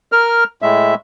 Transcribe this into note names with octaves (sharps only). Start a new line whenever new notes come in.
A#4 F6
A2 G#3 E5